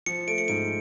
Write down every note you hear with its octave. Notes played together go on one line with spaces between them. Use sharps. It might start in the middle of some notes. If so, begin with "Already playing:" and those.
F3 C#7
A3 D7
C#7
G#2 D7